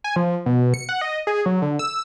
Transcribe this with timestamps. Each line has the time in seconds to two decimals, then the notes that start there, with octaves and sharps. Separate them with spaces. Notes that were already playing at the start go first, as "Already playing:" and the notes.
0.04 G#5
0.16 F3
0.46 B2
0.74 C#7
0.89 F#5
1.01 D#5
1.27 G#4
1.46 F#3
1.62 D3
1.79 E6